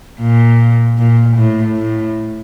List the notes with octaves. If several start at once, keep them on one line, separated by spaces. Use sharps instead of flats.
A#2
A#2
A2
A2